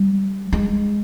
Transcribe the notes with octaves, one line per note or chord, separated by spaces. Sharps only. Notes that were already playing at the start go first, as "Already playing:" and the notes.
Already playing: G3
G#3